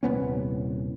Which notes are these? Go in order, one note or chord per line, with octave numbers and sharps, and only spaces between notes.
D#1 C2 B3 C#4